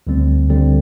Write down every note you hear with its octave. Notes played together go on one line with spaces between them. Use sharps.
D2 D3 G3 C4
D2 D3 G3 C4